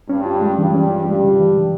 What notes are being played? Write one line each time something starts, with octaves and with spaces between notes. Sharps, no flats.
G2 G3 C#4
F4
G#3
G2 E3 G3
C#4
F4
G2 G3 G#3
C#3
E3
C#3